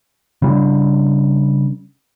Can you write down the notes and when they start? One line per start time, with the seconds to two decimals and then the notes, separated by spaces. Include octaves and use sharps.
0.42 C#3 G3 C4 D4